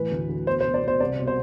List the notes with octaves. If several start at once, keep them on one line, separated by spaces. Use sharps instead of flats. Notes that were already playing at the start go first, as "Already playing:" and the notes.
Already playing: A2 E3 B4
D2
D2
B2 C5
C5
B2
D5
B2
C5
C2 D5
B2
C5